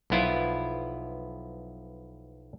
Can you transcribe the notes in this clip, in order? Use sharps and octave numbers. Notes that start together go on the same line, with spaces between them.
B1 F3 B3 E4 F4